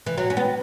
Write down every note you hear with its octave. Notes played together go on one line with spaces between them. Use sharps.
E3
F#3
C#4
B3